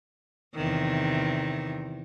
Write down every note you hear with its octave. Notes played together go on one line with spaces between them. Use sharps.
E2 C3 D#3